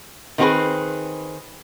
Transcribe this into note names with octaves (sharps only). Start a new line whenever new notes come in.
D#3 B3 C4 F#4 G#4 B4